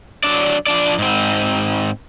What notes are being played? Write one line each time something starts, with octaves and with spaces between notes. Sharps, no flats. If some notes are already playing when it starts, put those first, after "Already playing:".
F#3 D4 D5
F3 D4 D5
G#2 C4